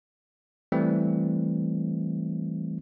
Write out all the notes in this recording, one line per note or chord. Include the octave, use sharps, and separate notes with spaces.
E3 G3 A3 C4